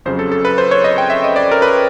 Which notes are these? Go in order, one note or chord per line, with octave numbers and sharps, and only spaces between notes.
F2 C#3 F#3 C5
A4
A4
B4
C5
C#5
D#5
G5
E5
D#5
D5
A#4
B4